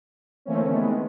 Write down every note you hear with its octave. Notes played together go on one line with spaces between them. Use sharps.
D3 E3 A3 A#3 C4 C#4
D#3 G#3 A3 B3